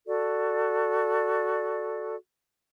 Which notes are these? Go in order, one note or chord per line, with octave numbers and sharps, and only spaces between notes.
F#4 A4 D5